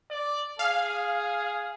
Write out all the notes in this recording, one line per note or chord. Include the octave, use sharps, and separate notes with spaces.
D5
G#4 F5